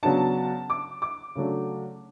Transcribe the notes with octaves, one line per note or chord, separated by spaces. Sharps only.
C#3 F#3 B3 D4 A5
D6
D6
C#3 F#3 A3 D4